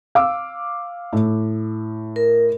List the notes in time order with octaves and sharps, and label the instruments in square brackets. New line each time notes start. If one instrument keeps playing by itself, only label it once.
[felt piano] F5 D6 E6
A2
[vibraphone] A#4